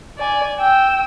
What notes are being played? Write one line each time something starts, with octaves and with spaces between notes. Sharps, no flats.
D5 G#5
G5 E6